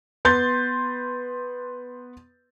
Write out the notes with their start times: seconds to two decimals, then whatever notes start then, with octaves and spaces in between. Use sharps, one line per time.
0.25 B3 B4 C6 G6 A6